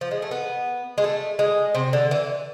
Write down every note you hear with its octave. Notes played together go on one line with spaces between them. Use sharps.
F3
G#3
A3
B3
G#3
A3
G#3
C3
D3
E3